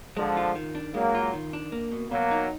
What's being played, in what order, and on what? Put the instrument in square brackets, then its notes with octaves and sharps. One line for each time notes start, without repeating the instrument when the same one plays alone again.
[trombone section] D3 F3 [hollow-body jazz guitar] G#3
[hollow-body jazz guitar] F4
D#3
D4
[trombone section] F#3 A#3 [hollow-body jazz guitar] G#3
[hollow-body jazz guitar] F4
D#3
D4
A#3
B2
[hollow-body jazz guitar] B2 [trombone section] F#3 A#3
[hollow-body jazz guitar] D#4